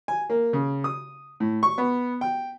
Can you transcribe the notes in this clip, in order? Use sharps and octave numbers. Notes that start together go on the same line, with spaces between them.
G#5
A#3
C#3
D#6
A2
C#6
B3
G5